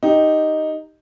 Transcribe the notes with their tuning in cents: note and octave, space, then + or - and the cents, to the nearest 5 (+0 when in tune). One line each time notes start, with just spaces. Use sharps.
D#4 +0 G4 +0